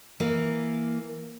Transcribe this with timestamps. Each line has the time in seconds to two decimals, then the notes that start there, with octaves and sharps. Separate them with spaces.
0.20 E3 A#3